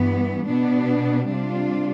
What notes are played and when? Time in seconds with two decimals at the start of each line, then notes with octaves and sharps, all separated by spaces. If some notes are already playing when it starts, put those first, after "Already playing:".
Already playing: G2 E3 B3
0.47 B2 B3 D4
1.29 C3 G3 D4 F4